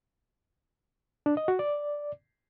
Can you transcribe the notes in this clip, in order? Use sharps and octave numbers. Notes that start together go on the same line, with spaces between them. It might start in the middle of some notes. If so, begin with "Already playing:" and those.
D4
D#5
F#4
D5